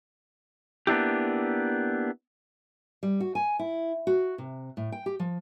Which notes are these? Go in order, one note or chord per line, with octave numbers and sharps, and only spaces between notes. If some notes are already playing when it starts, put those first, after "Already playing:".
A#3 B3 D4 E4 G4
G3
F#4
G#5
E4
F#4
C3
A2
G5
G4
F3